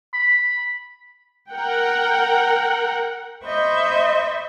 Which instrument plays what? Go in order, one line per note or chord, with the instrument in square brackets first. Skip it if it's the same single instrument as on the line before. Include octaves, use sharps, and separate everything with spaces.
[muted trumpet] B5
[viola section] A#4 F#5 G5
[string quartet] C5 D#5 E5 B5 C#6 G6